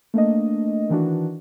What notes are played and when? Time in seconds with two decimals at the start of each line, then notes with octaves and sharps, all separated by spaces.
0.14 A3 A#3 D4 D#5
0.89 D#3 E3 D4 F#4